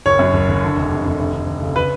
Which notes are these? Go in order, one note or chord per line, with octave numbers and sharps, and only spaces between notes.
F#1 C#5
F#2
F#1
F#1
D3
F1
F2
F1
D2
D2
D2
C#3
C#3 B4